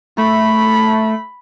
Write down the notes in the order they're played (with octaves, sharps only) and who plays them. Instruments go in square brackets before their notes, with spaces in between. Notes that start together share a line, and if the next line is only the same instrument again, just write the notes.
[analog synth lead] A3 [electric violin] B5